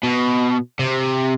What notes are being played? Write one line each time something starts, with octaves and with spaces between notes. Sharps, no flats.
B2
C3